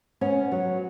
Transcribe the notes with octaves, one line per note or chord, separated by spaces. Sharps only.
B3 C#4
F#3